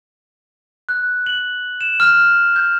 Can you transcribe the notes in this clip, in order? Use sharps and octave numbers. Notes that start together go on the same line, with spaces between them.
F#6
F#7
E7
F6
G6